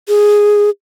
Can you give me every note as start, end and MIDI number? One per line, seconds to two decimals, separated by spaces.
0.08 0.70 68